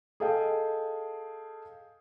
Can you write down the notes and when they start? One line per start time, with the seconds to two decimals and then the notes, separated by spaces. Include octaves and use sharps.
0.20 G#4 A4 D#5 F5 G5